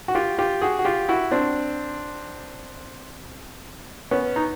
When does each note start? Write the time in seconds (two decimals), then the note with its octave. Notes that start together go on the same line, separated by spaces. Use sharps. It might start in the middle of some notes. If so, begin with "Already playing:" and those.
0.08 F#4
0.15 F4 G4
0.38 F4 G4
0.62 F#4 G#4
0.79 F#4
0.85 F4 G4
1.09 E4 F#4
1.31 C4 D4
4.11 B3 C#4
4.36 D#4